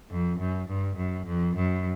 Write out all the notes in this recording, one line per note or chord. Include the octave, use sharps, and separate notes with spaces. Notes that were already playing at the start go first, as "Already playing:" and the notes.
F2
F#2
G2
F#2
F2
F#2